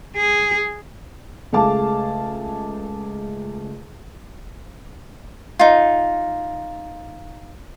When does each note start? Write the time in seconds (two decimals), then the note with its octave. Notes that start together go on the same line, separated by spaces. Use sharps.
0.16 G#4
1.52 C#2 A3 G#4 F5 A5 D6
5.59 D#4 F4